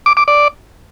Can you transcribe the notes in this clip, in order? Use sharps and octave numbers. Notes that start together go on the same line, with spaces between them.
D6
D6
D5